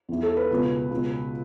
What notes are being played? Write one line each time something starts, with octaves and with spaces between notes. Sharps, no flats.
E2 E3
A4
B4
C#2 B2
C#2 B2